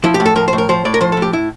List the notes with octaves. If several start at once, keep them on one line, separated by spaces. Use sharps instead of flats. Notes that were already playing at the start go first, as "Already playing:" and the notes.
F3 E4
G4
A2
A4
F3 A#4
C5
A2
A#4
F3 C5
A2 D5
A#4
F3 C5
A4
A2
G4
E4